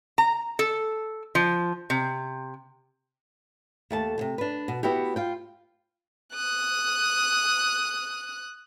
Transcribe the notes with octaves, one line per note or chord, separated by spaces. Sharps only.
A#5
A4
F3
C3
D#2 A3 A5
D2 C3
D4 B4
B2
B3 E4 F#4 G4
F4 G5
D#6 F#6